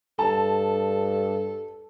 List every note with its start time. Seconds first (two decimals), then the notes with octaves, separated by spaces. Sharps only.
0.19 G2 A4 A5